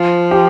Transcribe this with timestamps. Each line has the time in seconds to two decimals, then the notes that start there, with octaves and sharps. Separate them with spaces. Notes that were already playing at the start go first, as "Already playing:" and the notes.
Already playing: F3 F4
0.31 G4